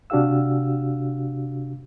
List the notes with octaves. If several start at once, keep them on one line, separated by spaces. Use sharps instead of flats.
C3 D4 F#4 G4 F5 E6